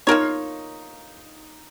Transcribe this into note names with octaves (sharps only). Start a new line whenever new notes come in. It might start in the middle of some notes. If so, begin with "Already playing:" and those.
A#3 D#4 F4 A#4 C#5